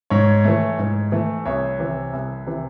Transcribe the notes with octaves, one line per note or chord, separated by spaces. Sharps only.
G#2 C#5
E3 A3
G#2
E3 A3
C2 C#5
C3 E3
C2
C3 E3